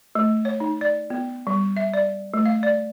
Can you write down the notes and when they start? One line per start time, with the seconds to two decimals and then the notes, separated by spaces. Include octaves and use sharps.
0.15 A3
0.45 C#5
0.60 D#4
0.81 D5
1.10 B3
1.47 G3
1.77 E5
1.94 D5
2.34 A3
2.46 F5
2.63 D5